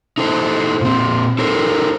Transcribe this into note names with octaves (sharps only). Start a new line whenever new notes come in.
D#4 E4 A4 C5
A#2 C4
D#4 A4 A#4 C5